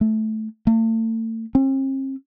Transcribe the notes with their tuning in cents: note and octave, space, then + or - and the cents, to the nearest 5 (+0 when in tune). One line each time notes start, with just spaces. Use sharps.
A3 -10
A3 +35
C4 +45